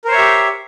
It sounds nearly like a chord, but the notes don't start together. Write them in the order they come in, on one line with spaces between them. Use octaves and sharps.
A#4 C5 C#5 E5 G4